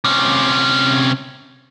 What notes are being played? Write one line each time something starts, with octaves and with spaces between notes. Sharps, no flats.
C3 C#4